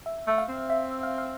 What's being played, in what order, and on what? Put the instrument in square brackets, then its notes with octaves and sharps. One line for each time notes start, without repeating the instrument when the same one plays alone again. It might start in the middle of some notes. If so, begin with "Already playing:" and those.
[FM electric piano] E5
[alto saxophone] A3
[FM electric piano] F5
[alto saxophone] C4
[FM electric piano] E5
F5
F5